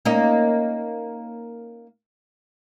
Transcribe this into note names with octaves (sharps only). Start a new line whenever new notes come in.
A#3 C#4 D#4